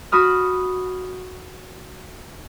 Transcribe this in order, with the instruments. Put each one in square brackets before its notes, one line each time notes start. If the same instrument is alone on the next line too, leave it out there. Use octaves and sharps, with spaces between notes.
[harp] F#4 B5 D#6 F6